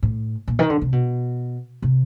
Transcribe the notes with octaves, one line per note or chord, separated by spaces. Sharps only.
A2
A#2
D#3
D3
C3
B2
C3